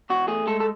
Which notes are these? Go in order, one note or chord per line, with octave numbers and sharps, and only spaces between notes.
E2 F#4
A3 G#4
G#3 A4
A4